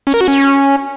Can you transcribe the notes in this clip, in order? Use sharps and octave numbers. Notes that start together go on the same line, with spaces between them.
C#4
A#4
F#4
C#4